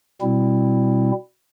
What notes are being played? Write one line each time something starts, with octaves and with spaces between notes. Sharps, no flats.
B2 G3 C4 E4